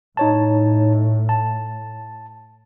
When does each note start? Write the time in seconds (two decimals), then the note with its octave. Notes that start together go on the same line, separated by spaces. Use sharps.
0.17 A2 D#4 C#5 A5
1.29 A5